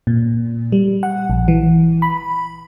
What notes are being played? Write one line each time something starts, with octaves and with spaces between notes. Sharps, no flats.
A#2
G3
F#5
A#1
E3
B5